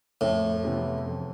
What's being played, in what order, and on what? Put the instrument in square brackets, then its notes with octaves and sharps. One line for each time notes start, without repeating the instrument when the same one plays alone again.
[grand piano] F2 [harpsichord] A2
[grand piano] C3 E3 B3
F2